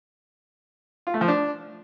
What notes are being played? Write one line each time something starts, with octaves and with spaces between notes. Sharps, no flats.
F4
A3
F3
D4